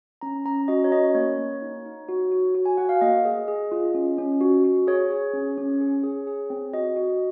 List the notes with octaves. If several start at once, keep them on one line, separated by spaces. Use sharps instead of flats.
C#4 A#5
C#4 A#5
F#4 D#5
C#5
C#4 D#5
A#3 C#5
A#3
D#4
D#4
F#4
F#4
F#4
G#5
F#4 F#5
F5
A#3 D#5
G#4
G#4
F4
C#4
C#4
F#4
F#4
G#4 C#5
G#4
C#4
C#4
G#4
G#4
G#4
C4
F#4 D#5
F#4